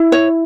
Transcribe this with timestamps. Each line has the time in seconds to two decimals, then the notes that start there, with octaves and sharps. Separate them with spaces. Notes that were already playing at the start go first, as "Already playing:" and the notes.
Already playing: E4
0.12 C#5